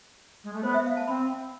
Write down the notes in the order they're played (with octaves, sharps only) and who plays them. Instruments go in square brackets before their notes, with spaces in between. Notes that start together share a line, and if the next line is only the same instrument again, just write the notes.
[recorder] G#3
A3
[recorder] B3 [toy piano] C5
[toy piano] E5
F5
A5
[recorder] C4 [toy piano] B5